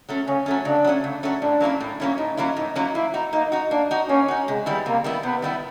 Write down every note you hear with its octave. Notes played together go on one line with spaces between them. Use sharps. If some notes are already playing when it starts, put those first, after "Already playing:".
F#3 A3 C#4
C#3 C#4
F#3 A3 C#4
C#3 D4
F#3 A3 C#4
C#3
F#3 A3 C#4
A2 D4
F#3 A#3 C#4 E4
A2
F#3 A#3 C#4 E4
A2 D#4
F#3 A#3 C#4 E4
A2 D#4
F#3 A#3 C#4 E4
A#3 E4
D#4 F#4
A#3 D#4
D#4 F#4
A#3 D4
D#4 F#4
A#3 C#4
D#4 F#4
C3 G#3
D#3 G3 B3 E4
C3 A#3
D#3 G3 B3 E4
C3 B3
D#3 G3 B3 E4